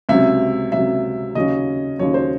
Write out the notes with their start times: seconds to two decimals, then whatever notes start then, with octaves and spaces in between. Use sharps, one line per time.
0.09 C#2 C3 F#3 E5
0.72 C#2 C3 F#3 E5
1.35 D#2 C#3 F#3 C#4 D#5
1.99 D#2 C#3 F#3 C#4 C#5
2.14 C5